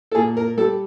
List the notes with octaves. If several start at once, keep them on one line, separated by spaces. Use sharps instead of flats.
A4
A#2 G#4
A#4
G3 A4